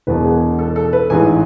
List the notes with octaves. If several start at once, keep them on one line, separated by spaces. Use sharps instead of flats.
E1 E2 B2 B4
G#4
A4
A4
B4
A1 G#2 E3 G#5